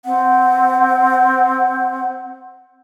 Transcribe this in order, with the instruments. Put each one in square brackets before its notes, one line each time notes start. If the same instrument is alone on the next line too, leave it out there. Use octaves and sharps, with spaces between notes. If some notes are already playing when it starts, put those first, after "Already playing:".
[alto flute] C4 [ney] F#5